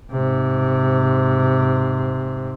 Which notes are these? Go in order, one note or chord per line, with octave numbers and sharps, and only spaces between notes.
G#2 C3